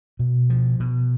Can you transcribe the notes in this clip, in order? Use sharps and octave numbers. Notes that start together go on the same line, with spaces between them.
B2
F3
B2